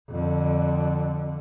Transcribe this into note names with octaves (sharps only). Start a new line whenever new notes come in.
F2 D3